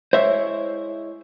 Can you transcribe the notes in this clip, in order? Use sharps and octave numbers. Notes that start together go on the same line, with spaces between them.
G#3 E4 C5 C#5 E5